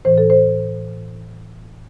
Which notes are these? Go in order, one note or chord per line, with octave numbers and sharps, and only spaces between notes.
A2 E3 C5
A4
C5